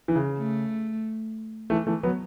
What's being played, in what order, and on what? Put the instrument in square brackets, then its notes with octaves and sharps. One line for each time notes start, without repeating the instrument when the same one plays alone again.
[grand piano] E3
C#3
[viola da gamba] A3
[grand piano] E3 A3
E3 A3
F#3 B3